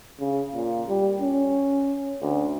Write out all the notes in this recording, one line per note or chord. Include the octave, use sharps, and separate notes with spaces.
C#3
A#2
G3
C#4
D2